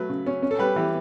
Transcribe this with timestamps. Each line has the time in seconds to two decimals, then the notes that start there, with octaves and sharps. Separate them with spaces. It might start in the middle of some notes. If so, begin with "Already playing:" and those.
Already playing: F#3 A3 B4
0.09 C#3
0.26 C#4
0.43 C#4
0.51 A4
0.59 G3 G4 B4
0.76 E3 G4